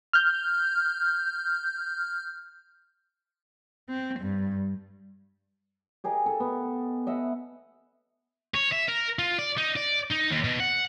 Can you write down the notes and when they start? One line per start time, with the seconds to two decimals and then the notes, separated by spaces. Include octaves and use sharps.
0.13 F6 G6
3.89 C4
4.19 G2
6.04 G4 G#4 A#4 D#5
6.26 A4
6.40 B3
7.07 D#5 E5 F#5
8.54 C#5
8.72 E5
8.88 A#4
9.19 F4
9.38 D5
9.57 D#4
9.76 D5
10.10 D#4
10.30 D#2
10.44 B2
10.60 F#5